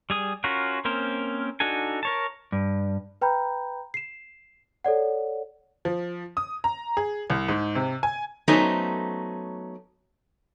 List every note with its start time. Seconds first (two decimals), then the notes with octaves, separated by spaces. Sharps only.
0.10 G3 G#4 D#6
0.44 C#4 F4 F#4 A#4
0.85 A#3 C4 C#4 A#4 C5
1.60 D4 D#4 F#4 A4 G#5
2.03 A#4 C#5 A5
2.52 G2
3.22 B4 G5 A#5 B5 G6
3.94 C7 E7
4.85 A4 C#5 D5 F#5
5.85 F3
6.37 D#6
6.64 A#5
6.97 G#4
7.30 C2
7.49 G#2
7.75 C3
8.03 G#5
8.48 F#3 A3 B3 C#4 D#4 C5